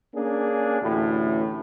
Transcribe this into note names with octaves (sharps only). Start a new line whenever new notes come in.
A#3 C#4 D4 G#4
A1 D2 A2